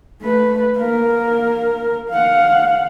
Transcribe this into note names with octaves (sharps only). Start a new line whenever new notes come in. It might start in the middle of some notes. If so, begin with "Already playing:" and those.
A3 B4
A#3 A#4
F5 F#5